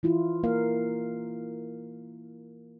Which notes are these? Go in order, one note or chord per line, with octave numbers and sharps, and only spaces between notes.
E3 E4 F4
A#3 A#4 F5